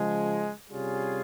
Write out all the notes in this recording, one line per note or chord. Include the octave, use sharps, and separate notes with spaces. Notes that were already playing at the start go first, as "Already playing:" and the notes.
Already playing: C#3 F3 G#3
C3 G3 C#4 F4 G#4